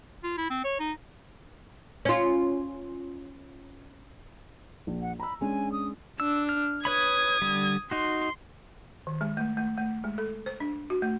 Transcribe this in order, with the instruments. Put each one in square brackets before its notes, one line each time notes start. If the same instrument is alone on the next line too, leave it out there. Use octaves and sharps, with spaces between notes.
[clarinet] F4
E4
C4
C#5
D#4
[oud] C#4 F4
[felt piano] A#1
[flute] F#5
[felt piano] A#5 E6 [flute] B5
[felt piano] G#3 C#4 D4 [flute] G#5
[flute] D#6
[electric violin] D4 [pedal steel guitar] E6
[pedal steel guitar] F6
[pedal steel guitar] B4 C#5 B5 [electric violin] D#6 G#6
[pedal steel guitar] D3 G3
[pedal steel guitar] D#4 F#4 [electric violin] C6
[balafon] D#3
G#3
A3
A3
A3
G#3
A4
C5
D4
F#4
A3